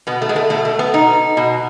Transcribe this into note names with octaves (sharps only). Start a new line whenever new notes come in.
B2 B3
A3
G#3
A3
B2 A3
A3
B3
B2 D#4
B2